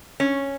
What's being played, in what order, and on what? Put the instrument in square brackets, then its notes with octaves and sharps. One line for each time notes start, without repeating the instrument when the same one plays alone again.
[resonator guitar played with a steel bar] C#4